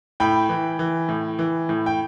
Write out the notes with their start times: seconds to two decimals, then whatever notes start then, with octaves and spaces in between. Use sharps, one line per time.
0.20 A2 G5 B5
0.49 E3
0.79 E3
1.09 A2
1.39 E3
1.69 A2
1.86 G5